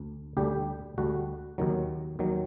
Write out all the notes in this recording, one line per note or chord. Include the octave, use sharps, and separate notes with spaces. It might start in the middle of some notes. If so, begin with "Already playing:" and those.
Already playing: D2
D2 D3 G3 G4
D2 D3 G3 F#4
D#2 D#3 F#3
D#2 D#3 F#3